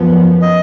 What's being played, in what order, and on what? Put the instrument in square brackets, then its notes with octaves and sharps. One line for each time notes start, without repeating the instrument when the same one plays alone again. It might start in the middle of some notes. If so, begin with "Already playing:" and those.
Already playing: [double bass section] F#2 F3 B3
[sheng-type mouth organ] D#5